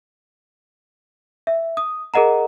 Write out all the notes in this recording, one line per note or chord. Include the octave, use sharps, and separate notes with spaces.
E5
D#6
G#4 A#4 D#5 F#5 A#5